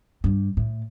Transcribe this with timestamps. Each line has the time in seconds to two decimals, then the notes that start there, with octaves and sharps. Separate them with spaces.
0.24 G2
0.57 A2